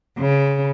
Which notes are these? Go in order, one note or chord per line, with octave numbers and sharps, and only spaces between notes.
C#3